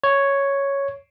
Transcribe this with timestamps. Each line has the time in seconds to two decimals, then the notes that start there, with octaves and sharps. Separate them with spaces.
0.04 C#5